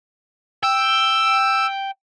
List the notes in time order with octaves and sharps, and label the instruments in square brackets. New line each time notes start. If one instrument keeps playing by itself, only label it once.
[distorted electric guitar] G5 [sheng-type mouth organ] E6